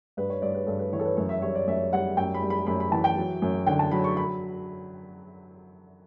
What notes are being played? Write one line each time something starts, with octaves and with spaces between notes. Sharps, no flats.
G2 B4
C#5
G2 D5
B4
G2 A4
B4
E3 C#5
A4
B4
F#2 C#5
E5
G3 C#5
D5
F#2 E5
G3 F#5
F#2 G5
B5
G3
B5
F#2 B5
B5
E3 A5
G5
F#3
F#2
D3 G5
A5
F#3 B5
C#6
B5